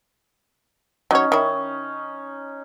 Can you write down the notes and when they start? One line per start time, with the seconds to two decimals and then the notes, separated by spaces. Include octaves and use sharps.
1.11 F#3 C#4 D#4 C#5
1.32 D#3 C#4 E4